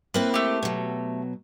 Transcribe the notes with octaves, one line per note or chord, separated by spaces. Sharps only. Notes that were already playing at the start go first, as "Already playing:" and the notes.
A#3 C4 E4 B4
A3 G4
B2 F#3